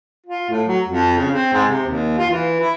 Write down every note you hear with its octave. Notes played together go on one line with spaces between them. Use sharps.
F4
A2
F#3
F2
C#3
C4
G#2
C3
D#2
F4
E3
E4